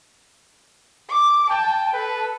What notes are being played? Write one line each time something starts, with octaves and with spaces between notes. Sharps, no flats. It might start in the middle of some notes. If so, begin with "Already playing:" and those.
D6
G5 A5
A4 B4